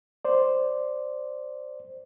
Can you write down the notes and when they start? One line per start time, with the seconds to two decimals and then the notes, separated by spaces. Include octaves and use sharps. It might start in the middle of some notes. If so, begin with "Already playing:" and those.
0.25 C5 D5